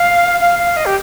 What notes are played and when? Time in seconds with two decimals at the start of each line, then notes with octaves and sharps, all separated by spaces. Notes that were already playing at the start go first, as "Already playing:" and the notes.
Already playing: F5
0.40 F5
0.59 F5
0.77 D#5
0.86 G4